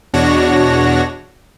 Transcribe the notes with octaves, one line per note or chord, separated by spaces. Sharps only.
E2 B2 D4 F#4 C#5 A#6